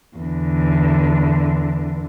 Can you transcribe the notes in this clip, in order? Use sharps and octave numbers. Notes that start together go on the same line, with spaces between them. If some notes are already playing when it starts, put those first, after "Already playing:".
E2 D3